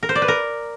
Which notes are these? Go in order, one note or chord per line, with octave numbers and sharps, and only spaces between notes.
A#4
C5
D5
B4
A#4